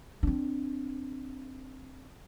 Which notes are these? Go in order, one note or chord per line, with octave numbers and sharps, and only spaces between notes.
C4 D4